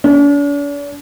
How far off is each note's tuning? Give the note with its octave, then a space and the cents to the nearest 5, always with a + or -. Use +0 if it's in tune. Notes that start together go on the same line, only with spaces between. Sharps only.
D4 -45